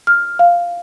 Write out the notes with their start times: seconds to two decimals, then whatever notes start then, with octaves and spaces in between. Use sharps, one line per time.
0.07 F6
0.39 F5